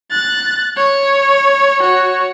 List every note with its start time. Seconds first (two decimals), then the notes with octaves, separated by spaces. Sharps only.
0.11 F#6 A6
0.77 C#5
1.81 F#4 C#5